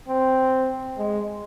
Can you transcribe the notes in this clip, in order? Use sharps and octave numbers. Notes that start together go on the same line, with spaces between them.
C4
G#3